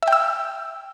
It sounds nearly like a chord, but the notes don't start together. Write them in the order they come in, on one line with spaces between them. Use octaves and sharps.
E5 G5 E6